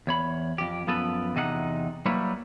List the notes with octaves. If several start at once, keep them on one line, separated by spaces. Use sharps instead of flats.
E2 C#5 B5
F2 G4
F#2 F3 B3 A4 B4
E2 C3 D#4 G#4 F#5
F#3 G3 A#3 E4 B4 C#5